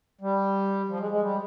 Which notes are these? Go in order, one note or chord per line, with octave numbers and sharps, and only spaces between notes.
G3
F3
G#3
G#3
G3